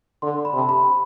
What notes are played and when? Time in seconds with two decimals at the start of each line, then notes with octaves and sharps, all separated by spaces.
0.22 D3 C6
0.45 B5
0.53 C3
0.59 A5
0.69 B5